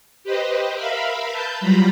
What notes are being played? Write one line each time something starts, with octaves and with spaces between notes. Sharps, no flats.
G4 B4 C5 D#5
A#4 E5 F5 B5
B4 A5 G6
F#3 G3 F4 A#5 B5